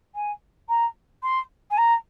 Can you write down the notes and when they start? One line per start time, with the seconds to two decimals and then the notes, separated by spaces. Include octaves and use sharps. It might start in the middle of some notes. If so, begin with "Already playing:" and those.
0.15 G#5
0.69 A#5
1.23 C6
1.71 G#5
1.78 A#5